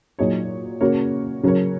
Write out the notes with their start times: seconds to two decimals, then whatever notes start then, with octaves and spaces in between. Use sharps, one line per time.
0.19 A#2 F#3 D#4 G#4 C#5
0.80 C#3 A#3 F#4 A#4 C#5
1.43 C#3 F#3 C#4 A#4 C#5